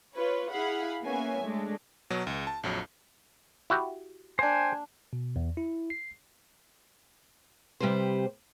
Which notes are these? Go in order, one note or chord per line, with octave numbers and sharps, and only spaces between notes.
F4 B4 C#5
E4 G#4 F5 F#5 B5
A#3 B3 C#4 C#5 E5 G#5
G#3 A3 D4
B2 F#3
C#2
A5
A#1 F2 F#3
E4 F#4 G4
A#3 D4 C5 G5 G#5
B2
E2
E4
C7
C3 G3 G4 B4 C5